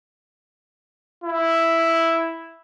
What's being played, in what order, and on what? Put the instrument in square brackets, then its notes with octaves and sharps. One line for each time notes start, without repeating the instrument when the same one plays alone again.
[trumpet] E4